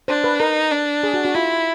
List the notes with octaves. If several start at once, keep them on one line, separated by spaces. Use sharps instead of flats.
D4 C5
B4
D#4 A#4
D4
G#4
F#4
F#4
E4 F4